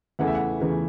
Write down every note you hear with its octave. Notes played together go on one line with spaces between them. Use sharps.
E2 C#3 E3 A3 F#5
E5
F#5
E2 C#3 E3 A3